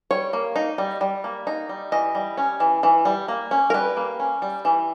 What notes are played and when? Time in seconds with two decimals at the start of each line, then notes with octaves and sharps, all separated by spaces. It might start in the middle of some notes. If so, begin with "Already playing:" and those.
0.11 G3 C#5
0.33 A#3
0.56 D#4
0.78 G3
1.01 G3
1.24 A#3
1.47 D#4
1.69 G3
1.92 E3 D#5
2.15 G3
2.37 C#4
2.60 E3
2.83 E3
3.05 G3
3.28 A#3
3.51 C#4
3.70 A#4
3.74 G3 B4
3.97 A#3
4.20 C#4
4.42 G3
4.65 E3